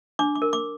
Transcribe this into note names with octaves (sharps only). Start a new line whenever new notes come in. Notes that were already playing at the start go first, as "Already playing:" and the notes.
D4 D6
D6
A#4
D6